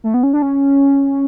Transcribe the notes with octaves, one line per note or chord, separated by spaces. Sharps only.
A3
B3
C#4
D4
C#4